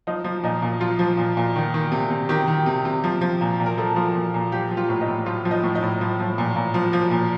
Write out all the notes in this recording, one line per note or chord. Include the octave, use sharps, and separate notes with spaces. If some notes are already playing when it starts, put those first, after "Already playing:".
F3 D#4
F3
A#2 D#4
A#2
F3 F4
F3
A#2
A#2
D#3
D#3
C3
C3
D#3 G4
D#3
C3
C3
F3
F3
A#2
A#2
A#4
F3 A4
F3
A#2
A#2
F3 G4
F3
F4
A2
D#4
A2
F3 F4
F3
D#4
A2
D#4
A2
F3
F3
A#2
A#2
F3
F3
A#2